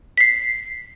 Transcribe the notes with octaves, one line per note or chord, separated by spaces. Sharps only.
B6 C7